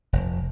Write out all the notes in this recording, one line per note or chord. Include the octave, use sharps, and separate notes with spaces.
F1